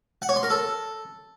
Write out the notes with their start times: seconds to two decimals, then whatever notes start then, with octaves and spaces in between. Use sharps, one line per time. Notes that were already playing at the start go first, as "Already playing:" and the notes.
0.22 F#5
0.29 C#5
0.36 C6
0.43 A#4
0.50 A4